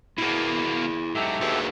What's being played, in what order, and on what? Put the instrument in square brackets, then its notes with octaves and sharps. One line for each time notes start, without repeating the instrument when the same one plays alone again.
[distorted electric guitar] B2 A#3 [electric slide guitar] E4 G#4
[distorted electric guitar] G#2 F#3 [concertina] G4 A4 E5
[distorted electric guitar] D#2 [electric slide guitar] F#4 G#4 B4